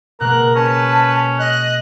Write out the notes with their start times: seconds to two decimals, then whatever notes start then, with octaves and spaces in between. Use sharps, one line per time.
0.21 B2 G#3 A#3 A#4 F#6
0.56 C#4 B4 A5
1.39 D#5 F#6